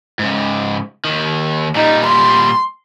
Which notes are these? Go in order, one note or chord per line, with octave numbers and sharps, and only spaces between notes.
G#2 C#3
D#2 D#3
A#2 G3 D#4
C6